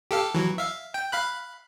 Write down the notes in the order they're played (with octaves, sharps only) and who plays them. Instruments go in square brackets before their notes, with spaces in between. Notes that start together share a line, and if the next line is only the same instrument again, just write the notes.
[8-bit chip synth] G4 A4 F5
E3 F#3
E5 F5
G5
F5 B5 F#6